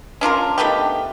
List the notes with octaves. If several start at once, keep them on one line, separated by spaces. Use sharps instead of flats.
C#4 D4 F4 A#4
D#3 A3 B3 G4